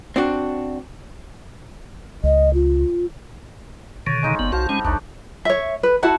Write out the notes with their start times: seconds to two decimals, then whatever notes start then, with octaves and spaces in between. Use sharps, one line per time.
0.16 C4 D4 F#4
2.23 C#2 D#5
2.54 F4
4.07 B2 D3 D#3 C#5
4.23 G#3 D#4 F4
4.39 G1 B3
4.52 B1 F#4 C5 F5 A5
4.69 G3 G#3 C#4
4.85 A1 D#2 D4 D#4 C#5
5.45 C#5 E5
5.83 B4
6.03 E4 F#4 F#5 A5